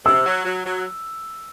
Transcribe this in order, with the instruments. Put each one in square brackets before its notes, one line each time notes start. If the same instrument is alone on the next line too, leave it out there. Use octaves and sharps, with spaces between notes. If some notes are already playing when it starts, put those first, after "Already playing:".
[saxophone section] C3 [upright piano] E6
[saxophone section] F#3
F#3
F#3